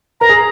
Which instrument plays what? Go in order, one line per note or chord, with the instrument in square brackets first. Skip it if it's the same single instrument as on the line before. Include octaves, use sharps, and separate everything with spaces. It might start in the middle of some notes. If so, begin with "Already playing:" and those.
[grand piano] A#4 [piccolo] A#5
[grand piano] G#4